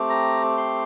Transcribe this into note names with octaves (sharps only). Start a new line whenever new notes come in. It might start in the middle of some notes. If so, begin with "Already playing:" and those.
Already playing: A3 C4 G4
A#5
C6